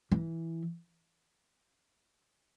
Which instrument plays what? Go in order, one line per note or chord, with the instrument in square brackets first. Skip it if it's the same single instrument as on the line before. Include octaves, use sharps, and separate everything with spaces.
[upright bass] E3